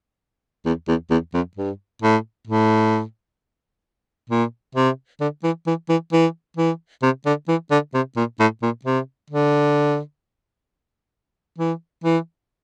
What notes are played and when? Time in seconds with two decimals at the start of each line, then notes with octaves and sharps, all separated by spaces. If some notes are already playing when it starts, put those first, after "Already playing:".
0.66 E2
0.88 E2
1.10 E2
1.34 F2
1.57 G2
2.02 A2
2.47 A2
4.30 A#2
4.75 C3
5.21 D3
5.44 E3
5.67 E3
5.89 E3
6.13 E3
6.57 E3
7.03 C3
7.26 D3
7.48 E3
7.71 D3
7.94 C3
8.17 A#2
8.40 A2
8.62 A#2
8.85 C3
9.30 D3
11.59 E3
12.04 E3